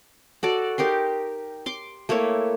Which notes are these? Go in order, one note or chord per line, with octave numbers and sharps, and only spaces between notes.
F#4 A4 D5
D#4 G4 A#4 C6
C6 D6
A3 A#3 E4 C#5